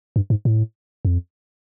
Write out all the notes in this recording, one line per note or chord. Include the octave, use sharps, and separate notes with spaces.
G2
G#2
A2
F2